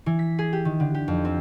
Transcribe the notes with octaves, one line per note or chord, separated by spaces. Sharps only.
E3
B6
G#4
G4
D#3
D3
G4
F2
C4